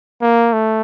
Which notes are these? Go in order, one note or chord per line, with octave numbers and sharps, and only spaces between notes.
A#3
A3